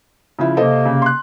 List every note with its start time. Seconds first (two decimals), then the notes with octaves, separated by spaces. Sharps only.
0.39 C#3 F3 E4
0.57 C3 A#3 A4 C5 D#5
0.86 C#3
1.02 C6 F#6